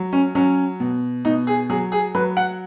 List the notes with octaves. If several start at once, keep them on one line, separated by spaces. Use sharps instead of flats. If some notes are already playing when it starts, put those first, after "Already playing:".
Already playing: F#3
C#4
F#3 C#4
B2
B2 D#4
G#4
F#3 G#4
G#4
F#3 B4
F#5